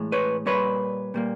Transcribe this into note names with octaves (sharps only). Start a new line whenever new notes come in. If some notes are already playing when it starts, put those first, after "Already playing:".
Already playing: A2 E3 G#3
B4 C#5
A#2 G3 A#3 B4 C#5
A#2 G3 A#3